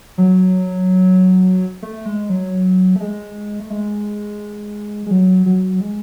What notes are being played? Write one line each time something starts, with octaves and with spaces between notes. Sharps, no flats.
F#3
A3
G#3
F#3
A3
G#3
A3
G#3
G#3
F#3
F#3
G#3